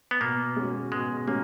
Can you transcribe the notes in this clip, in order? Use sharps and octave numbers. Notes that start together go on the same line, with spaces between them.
B3
B2 A#3
G#3 C#4 F#4
B2 G#3
G#3 A#3 C#4 F#4